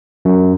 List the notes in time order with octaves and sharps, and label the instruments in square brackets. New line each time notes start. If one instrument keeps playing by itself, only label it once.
[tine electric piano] F#2